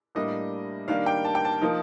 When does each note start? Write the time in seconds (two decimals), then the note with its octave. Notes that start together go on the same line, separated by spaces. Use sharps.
0.15 A2 G3 A#3 D4 D#5
0.88 D#3 G3 A#3 D4 F5
1.06 G5
1.25 A5
1.35 G5
1.45 A5
1.61 F3 A#3 D#4